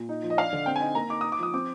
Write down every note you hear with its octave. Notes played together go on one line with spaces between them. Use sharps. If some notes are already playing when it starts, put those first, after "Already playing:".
Already playing: A#2
D#4
F3
D#5
D4 F5
D3
C4 G5
G#5
D#4
A#3 A#5
D#4 D6
D#4 D#6
D6
F3 D#6
C4 D6